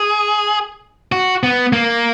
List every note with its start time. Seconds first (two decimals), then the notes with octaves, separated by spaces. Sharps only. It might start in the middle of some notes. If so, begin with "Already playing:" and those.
Already playing: G#4
1.12 F#4
1.43 B3
1.73 A#3